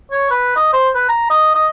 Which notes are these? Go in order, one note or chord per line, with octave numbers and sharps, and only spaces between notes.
C#5
B4
D#5
C5
B4
A#5
D#5
D#5